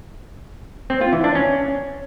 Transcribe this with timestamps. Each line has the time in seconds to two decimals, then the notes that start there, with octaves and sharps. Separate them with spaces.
0.90 C4
1.01 F4
1.13 E3
1.24 D4
1.35 C#4